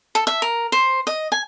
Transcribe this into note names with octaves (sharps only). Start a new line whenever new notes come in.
A4
E5
A#4
C5
D#5
G#5